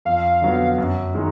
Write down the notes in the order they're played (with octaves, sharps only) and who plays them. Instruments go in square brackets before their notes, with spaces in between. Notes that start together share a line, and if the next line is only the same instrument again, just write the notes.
[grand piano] F2 [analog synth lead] F5
[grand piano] D3 F#3 B3
F#2
D#3 G#3 D#4